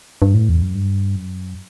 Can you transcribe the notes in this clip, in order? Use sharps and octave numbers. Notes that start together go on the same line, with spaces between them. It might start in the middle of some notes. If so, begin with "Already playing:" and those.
G2
A2
E2
F#2
G2
F#2